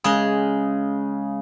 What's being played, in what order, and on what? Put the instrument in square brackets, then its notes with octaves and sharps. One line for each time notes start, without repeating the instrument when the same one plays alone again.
[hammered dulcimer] C#3 [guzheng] G#3 G#4